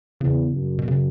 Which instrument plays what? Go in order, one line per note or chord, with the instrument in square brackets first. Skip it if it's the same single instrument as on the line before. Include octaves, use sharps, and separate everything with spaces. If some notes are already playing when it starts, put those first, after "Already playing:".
[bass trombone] E2 [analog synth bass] C#3
[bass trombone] F#2
[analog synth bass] B2
C#3